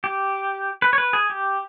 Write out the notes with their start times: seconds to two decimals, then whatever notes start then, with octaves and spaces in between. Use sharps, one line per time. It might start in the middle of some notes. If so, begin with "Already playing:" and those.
0.04 G4
0.82 B4
0.93 C#5
0.98 B4
1.13 G#4
1.30 G4